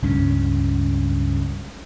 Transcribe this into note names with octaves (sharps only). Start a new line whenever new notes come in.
C#2 G2 C4 C#4